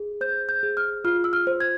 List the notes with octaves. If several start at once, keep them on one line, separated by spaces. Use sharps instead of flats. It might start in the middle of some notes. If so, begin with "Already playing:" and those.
Already playing: G#4
C5 G6
G6
G#4
F6
F4 F6
E6
F6
C5
G#6